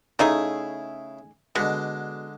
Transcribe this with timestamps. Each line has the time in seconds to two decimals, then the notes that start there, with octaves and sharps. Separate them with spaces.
0.19 C#3 A3 D#4 E4 G#4
1.55 B2 D3 G#3